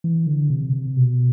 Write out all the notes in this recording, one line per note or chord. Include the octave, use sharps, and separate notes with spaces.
E3
D3
C3
C3
B2